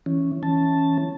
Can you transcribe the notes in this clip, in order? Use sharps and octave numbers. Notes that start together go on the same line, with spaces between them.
E3 C#4
E3 C#4 A5